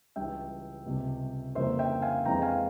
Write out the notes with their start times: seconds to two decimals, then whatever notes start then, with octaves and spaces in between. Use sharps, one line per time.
0.16 C#2 C#3 E3 G3 C#4 E5 G5
0.86 C#2 C3 G3
1.55 F2 C#3 E3 G3 A#3 C5 E5
1.79 E5 G5
2.02 F5 G#5
2.25 F2 E3 G#3 C4 G5 A#5
2.42 F5 G#5